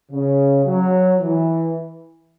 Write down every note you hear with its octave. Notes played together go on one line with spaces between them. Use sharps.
C#3
F#3
E3